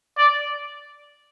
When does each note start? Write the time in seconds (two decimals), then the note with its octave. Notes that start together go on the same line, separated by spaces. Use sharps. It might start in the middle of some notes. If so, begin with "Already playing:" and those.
0.17 D5